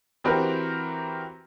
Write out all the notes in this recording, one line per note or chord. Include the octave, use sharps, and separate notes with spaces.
E3 C4 F#4 G4 A#4 B4